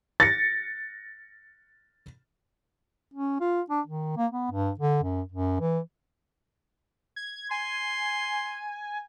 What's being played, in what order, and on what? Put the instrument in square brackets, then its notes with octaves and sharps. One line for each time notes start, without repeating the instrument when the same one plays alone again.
[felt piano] A6 A#6 C#7
[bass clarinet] C#4
F4
D4
D#3
A#3
B3
G2
D3
F#2
F#2
E3
[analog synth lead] G#6
[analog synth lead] G#5 [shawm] C6